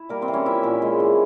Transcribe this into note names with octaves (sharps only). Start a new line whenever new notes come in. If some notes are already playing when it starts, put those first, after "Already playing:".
Already playing: E4
G3 A#3 A#4
C4 C5
E3
C#4 C#5
F3 E4 E5
A#2
G#3
E3